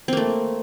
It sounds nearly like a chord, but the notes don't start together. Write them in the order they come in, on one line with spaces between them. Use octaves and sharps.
C4 A#3 A3